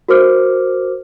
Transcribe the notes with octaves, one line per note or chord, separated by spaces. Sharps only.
F#4 A#4 C5 D6 F6